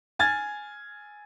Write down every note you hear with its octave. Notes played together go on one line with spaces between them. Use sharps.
G#5 F6 G#6 A6